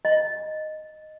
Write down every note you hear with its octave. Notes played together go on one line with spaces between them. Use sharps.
D#5